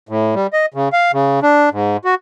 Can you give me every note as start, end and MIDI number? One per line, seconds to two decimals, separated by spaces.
0.09 0.35 45
0.35 0.47 55
0.53 0.66 75
0.74 0.89 49
0.93 1.12 77
1.13 1.40 49
1.43 1.69 62
1.72 1.97 44
2.05 2.15 66